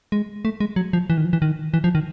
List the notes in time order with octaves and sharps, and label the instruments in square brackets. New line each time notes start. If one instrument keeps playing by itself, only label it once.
[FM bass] G#3
A3
G#3
F#3
F3
E3
D#3
F3
E3
D#3
E3
F3
D#3